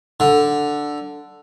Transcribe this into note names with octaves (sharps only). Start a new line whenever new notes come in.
D3